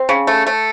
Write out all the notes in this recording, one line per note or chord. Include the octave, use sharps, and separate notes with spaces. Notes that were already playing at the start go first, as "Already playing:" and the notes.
Already playing: C4
C#3
A3
A3